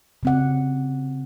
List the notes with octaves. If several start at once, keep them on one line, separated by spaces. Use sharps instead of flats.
C#3 C4 F#5